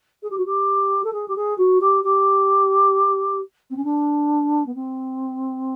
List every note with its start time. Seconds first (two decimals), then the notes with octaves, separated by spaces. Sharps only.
0.22 G#4
0.30 G4
0.37 F#4
0.46 G4
1.04 A4
1.13 G#4
1.28 G4
1.36 G#4
1.58 F#4
1.81 G4
2.04 G4
3.70 C4
3.76 C#4
3.84 D4
4.66 B3
4.75 C4